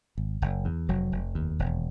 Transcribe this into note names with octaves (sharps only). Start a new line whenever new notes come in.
G#1
F#1
E2
F1 F#3
F1
D#2
E1